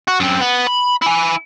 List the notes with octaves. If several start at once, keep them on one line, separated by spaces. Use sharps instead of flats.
F#4
F#2 C4
B3
B5
E4 G#5